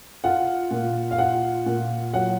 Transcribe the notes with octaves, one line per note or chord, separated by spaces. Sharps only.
F4 F#5
A#2
F5
F4 F#5
A#2
F#3 F#5